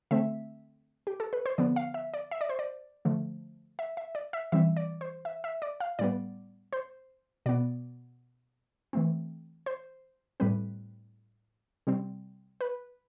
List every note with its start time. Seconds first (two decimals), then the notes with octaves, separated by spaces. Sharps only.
0.11 D3 A3 C4 E5
1.07 G4
1.20 A4
1.33 B4
1.46 C5
1.58 D3 F3 B3 D5
1.76 F5
1.94 E5
2.14 D5
2.31 E5
2.41 D5
2.49 C5
2.59 D5
3.05 D3 F3 A3
3.79 E5
3.97 E5
4.15 D5
4.33 E5
4.52 E3 G3 C4 E5
4.77 D5
5.01 C5
5.25 E5
5.44 E5
5.62 D5
5.80 F5
5.99 A2 G3 B3 D5
6.73 C5
7.46 B2 B3 D5
8.93 E3 A3 C4
9.66 C5
10.40 A2 G3 C4 B4
11.87 C3 G3 C4
12.61 B4